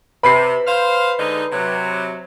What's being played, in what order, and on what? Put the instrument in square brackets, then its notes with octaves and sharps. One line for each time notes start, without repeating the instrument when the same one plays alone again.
[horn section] C3 [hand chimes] B4 [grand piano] B5 C7
[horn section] C5 F5
D3 G#3 D#4
C3 F#3